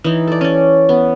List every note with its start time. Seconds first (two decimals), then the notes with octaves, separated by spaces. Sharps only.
0.04 E3 D#4
0.28 A4 D5
0.41 C#4 D5
0.89 B3